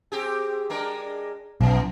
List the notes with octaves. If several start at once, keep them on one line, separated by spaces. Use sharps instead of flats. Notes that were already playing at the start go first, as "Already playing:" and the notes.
C4 G4 G#4
G#3 D4 A#4
B1 F2 E3